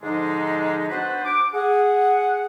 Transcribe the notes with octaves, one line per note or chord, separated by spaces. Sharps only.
G#2 D3 F3 G#3 D4 D#4
B3 D4 F#4 B4 C5
D6
G#4 F#5